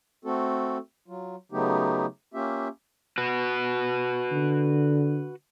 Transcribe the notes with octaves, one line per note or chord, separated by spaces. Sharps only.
A3 C4 F#4 A4
F#3 F4
C#3 F#3 A3 B3 D#4 G4
A#3 C#4 F4 G4 E5
F#4 B4
D3